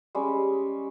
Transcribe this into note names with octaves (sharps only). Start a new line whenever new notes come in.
G3 G#3 C#4